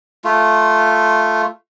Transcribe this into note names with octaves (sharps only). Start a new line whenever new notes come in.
A3 F4